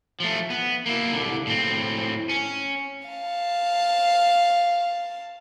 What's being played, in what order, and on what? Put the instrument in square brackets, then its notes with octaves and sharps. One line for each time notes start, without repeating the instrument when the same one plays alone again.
[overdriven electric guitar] F3 A3
B3
A#3 E4
C2 D3
A2 C4
C#4
[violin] F5 A5